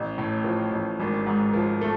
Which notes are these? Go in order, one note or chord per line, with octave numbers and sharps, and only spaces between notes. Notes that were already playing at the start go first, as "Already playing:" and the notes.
Already playing: A1
A2
F3
A1
G#1
G#2
F3
A3